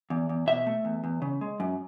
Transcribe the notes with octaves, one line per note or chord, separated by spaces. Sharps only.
E2
E2
B2 E5
A3
E2
E2
C#3
G#3
F#2